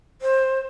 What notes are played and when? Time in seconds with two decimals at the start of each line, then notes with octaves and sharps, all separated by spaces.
0.22 C5